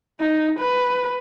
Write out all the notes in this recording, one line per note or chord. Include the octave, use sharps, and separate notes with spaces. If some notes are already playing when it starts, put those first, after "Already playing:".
D#4
B4